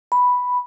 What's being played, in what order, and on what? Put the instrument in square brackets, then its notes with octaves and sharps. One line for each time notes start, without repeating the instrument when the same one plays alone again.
[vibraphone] B5